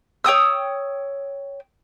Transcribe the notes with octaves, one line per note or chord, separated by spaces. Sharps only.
C#5 G5 D#6 E6